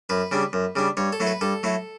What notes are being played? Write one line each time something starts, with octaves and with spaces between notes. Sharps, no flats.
F#2 B4
C#3 G3 D4
F#2
C#3 G3 D4
G2 C#5
A4
F#3 A3 E4
B4
G2 A4
F#3 A3 E4